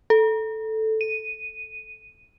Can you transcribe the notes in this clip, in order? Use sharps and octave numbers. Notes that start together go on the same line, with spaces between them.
A4
D#7